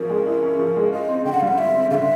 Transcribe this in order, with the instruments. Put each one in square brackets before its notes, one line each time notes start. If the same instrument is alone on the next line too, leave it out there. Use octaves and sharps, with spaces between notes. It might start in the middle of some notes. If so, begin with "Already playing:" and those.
Already playing: [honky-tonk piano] F3 C#4 E4 [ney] A#4
[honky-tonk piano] G#3
E4
C#4
F3
G#3
[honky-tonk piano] F4 [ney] D#5
[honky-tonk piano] C4
[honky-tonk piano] D3 [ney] G5
[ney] F#5
[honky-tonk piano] G3 [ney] F5
[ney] F#5
[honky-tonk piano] F4 [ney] E5
[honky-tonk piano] C4
[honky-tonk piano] D3 [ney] E5 F5